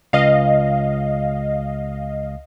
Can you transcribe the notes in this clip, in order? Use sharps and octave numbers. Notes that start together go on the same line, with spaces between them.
C#2 D#5 F5